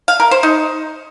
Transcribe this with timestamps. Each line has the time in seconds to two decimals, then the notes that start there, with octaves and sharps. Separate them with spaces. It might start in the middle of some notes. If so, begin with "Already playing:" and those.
0.08 F5
0.20 A#4
0.31 C5
0.43 D#4